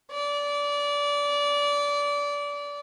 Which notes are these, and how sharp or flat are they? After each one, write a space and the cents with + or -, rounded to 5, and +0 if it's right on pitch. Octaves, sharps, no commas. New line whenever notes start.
D5 -25